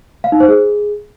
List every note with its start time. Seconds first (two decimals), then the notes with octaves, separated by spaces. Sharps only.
0.24 F5
0.32 D#4
0.40 C5
0.48 G#4